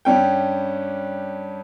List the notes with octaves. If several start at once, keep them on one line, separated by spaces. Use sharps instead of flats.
G2 G3 C#4 G5